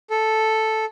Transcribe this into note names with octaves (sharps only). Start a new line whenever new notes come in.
A4